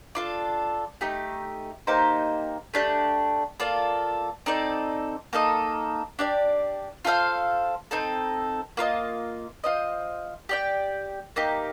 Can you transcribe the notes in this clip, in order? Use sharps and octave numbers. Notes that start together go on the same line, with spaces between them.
D4 F4 A4
A3 D#4 G4
A#3 D#4 G4 C5
A3 D4 G4
A#3 F4 A4 D5
C4 D#4 A4 D5
A#3 D#4 A4 D#5
D4 G4 D5
F4 A4 C5 F5
C4 D#4 A4
A#3 F4 A#4 D#5
F4 C5 D#5
G4 D5 G5
A#3 D#4 G4